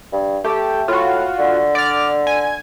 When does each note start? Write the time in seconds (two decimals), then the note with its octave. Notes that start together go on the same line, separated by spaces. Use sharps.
0.13 G2
0.44 A3 G4
0.88 A2 F4 F#4
1.39 D3
1.75 D5 F6
2.27 G#5